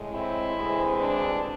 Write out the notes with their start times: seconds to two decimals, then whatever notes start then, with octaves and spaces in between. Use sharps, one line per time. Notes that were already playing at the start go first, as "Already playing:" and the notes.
Already playing: A2 G#3
0.12 C4 E4
0.56 D2 C3 E3 G#3 C4
1.01 D4